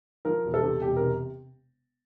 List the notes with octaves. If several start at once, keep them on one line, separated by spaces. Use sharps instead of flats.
F3 A#4
E1
A4
C3
E1 G4
C3 A#4